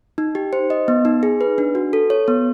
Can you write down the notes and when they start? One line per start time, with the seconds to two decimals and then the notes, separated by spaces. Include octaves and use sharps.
0.18 D#4
0.35 G4
0.53 C5
0.70 D#5
0.88 B3
1.05 D#4
1.23 G#4
1.41 B4
1.58 D4
1.75 F#4
1.93 A4
2.10 C#5
2.28 B3